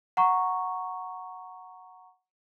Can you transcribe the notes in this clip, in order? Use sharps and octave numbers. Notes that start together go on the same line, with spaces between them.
F#5 A#5 C#6